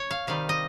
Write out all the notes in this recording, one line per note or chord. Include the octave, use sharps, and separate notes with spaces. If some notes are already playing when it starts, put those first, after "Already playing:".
Already playing: C#5
F5
C3 D#3 G3 F5
D#5